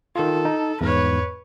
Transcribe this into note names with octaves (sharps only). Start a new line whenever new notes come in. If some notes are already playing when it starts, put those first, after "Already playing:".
D#3 F4 A4
D#4
E2 G#2 B4 C#5